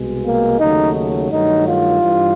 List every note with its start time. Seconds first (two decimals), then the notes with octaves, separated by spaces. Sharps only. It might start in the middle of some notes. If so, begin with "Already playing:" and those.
Already playing: C2 B2 G#3
0.25 A#3
0.60 D#2 C#3 F#3 A3 D#4
1.30 G2 D#3 F#3 A3 D#4
1.66 F4
2.01 G2 E3 G3